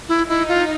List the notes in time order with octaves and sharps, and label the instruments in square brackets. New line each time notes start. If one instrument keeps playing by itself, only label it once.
[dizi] E4
[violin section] D#4 [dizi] E4
[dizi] F4